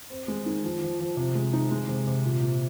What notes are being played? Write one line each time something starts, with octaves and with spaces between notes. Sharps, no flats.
C4
G#3
D#3
F3
F3
F3
C3
G#3
D#4
G#3
C3
C3
A#2
A#2